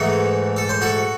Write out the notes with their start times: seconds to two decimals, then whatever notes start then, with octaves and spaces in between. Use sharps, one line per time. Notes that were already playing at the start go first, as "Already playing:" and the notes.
Already playing: G#2 E3 A3 F#4 A4
0.56 A4
0.69 C5
0.81 F#4 A4